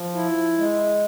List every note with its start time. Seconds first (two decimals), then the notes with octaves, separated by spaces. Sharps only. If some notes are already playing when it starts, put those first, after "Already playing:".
Already playing: F3
0.15 E4
0.58 G#3